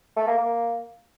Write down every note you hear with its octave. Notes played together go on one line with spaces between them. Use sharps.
A3
A#3
A#3